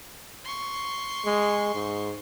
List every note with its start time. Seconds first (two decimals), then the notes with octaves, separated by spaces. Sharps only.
0.44 C6 C#6
1.26 G#3
1.74 G#2